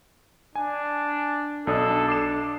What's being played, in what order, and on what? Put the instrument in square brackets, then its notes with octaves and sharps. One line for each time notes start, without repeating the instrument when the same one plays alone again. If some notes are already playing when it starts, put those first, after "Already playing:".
[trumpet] D4 [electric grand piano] G#5
[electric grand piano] B1 D4 D#6 [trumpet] A4
[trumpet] D4 [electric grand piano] D6 C7 E7